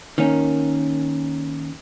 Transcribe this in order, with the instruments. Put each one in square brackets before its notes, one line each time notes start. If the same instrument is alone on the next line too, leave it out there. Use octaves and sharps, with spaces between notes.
[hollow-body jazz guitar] D#3 A#3 C#4